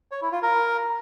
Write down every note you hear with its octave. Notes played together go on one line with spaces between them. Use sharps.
C#5
E4
F4
A#4